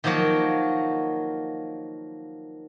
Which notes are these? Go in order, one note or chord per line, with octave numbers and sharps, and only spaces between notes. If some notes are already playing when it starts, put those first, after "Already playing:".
D#3 F3 F#3 A#3 C#5